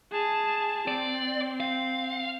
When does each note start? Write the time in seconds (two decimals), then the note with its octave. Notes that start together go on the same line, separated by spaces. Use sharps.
0.12 G#4 A5
0.88 C4 D5
1.60 F5